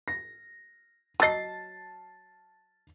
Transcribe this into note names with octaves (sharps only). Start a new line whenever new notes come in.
A#6
F#3 D#5 A5 A6 C7